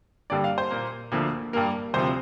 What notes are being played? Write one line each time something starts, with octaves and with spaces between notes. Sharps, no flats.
G2 D3 G3 A#3 D5
F5
C5
A#2 A#3
D2 D3 F3 A#3
G2 G3 A#3 A#4
D2 C3 F3 C5